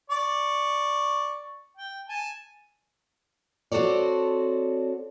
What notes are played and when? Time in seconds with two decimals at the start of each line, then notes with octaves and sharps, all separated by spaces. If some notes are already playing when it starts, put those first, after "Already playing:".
0.10 D5 C#6
1.77 G5
2.09 G#5 A5
3.72 C4 F#4 A4 C#5 D5